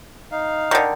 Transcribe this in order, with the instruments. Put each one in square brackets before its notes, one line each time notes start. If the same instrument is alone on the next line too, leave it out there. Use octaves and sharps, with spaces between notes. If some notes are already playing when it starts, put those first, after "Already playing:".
[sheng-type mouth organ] D#4 F5
[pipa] D3 D#3